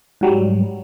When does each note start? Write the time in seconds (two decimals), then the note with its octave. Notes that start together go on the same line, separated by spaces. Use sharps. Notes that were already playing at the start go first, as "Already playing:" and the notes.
0.21 G#2 F#3 G3